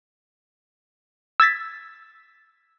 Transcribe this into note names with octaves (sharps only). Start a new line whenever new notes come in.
E6 G#6 A6 B6